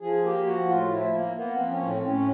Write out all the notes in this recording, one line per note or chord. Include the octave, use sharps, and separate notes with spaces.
F3 G#4
A#3 G4
F3 F#4
A2 F4
F3 E4
A#3
A#3 B3
C4
F3
C#4
A2
C4
A2 C#4